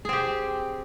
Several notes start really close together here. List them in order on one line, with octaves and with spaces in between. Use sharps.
G#4 C4 G4